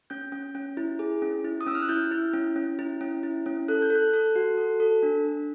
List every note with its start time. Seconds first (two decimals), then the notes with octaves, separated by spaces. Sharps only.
0.10 C#4 G6
0.32 C#4
0.55 C#4
0.77 E4
0.99 G#4
1.22 C#4
1.44 E4
1.61 D#6
1.66 C#4 E6
1.75 F6
1.82 F#6
1.89 E4 G6
2.11 E4
2.33 C#4
2.56 C#4
2.79 E4
3.01 C#4
3.23 E4
3.46 C#4
3.68 A4 F#6
3.82 G6
3.90 A4
3.96 F#6
4.13 A4
4.36 F#4
4.58 A4
4.80 A4
5.03 D4
5.25 D4